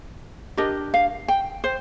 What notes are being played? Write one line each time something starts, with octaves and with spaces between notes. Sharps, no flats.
D4 G4 A#4 D#5
F5
G5
C5